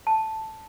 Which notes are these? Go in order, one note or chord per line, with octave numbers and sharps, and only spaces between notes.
A5